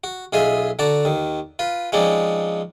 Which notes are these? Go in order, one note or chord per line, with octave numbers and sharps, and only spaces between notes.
F#4
B1 F4 G#4 D#5 E5 G#5
D3 F#4 D5 A5 A#5
D#2 D#3
F4 B4
F3 G#3 C4 C#4 D#4 D5